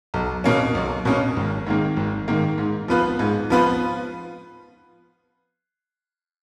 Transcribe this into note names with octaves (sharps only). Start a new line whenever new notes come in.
B1
B2 A#3 C#4
B1
B2 A#3 C#4
G#1
G#2 D#3 A#3
G#1
G#2 D#3 A#3
G#2
F3 B3 F4 B4
G#2
F3 B3 F4 B4